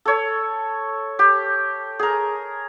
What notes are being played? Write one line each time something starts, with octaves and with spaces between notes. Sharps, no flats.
A4 C#5
G4
G#4 A#4